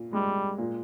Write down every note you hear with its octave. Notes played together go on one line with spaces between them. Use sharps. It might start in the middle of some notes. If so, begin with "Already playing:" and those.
Already playing: A#2
G3 G#3
A#2